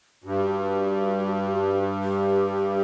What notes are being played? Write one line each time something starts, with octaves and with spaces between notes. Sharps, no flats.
G2 F#4
G4